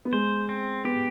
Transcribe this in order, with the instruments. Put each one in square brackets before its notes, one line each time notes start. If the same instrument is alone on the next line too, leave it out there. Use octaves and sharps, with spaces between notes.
[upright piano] B3
[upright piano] G#3 [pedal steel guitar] C5
[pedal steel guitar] C4
[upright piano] B3 [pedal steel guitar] G4